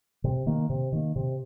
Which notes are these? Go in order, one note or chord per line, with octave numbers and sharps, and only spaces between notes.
C3
D#3 A#3
C3
D#3 A#3
C3